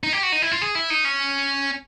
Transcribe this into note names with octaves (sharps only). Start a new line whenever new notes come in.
D#4
G4
F#4
D#4
E4
F4
G#4
E4
D#4
C#4